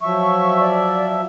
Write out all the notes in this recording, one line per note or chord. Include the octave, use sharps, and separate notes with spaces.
F3 F#3 E5 C#6
D5